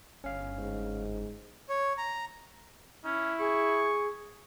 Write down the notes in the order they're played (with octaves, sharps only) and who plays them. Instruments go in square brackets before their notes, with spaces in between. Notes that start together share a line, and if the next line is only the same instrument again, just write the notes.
[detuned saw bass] G1 [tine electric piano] C#4 F5
[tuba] G#2
[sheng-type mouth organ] C#5
A#5
[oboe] C#4 [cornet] E4
[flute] G#4 [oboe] C#6